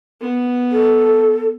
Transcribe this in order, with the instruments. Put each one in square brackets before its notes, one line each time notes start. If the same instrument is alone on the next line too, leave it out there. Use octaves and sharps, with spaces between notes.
[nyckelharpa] B3
[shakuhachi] A4